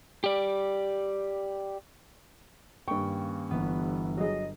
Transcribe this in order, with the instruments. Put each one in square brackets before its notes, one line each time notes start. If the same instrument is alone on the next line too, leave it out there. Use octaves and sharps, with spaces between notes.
[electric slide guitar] G4 D5
[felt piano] G2 C#6 [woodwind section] D#3 A#3 C#4 [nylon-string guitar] G5
[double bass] G1 [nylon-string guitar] E3 B3
[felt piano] F#3 G#4 [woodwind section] D#5